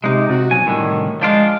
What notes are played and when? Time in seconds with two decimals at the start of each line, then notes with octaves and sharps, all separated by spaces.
0.04 C3 G#3 D#4
0.29 C3 F#4
0.51 B1 G#5
0.65 C2 A2 D3 D#3
1.22 F3 G#3 D4 F4